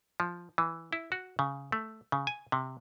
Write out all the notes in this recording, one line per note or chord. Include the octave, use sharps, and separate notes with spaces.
F3
E3
E4
F#4
C#3
A3
C#3
G#5
C3